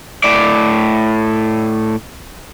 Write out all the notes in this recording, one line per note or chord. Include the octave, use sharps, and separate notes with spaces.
A2 D5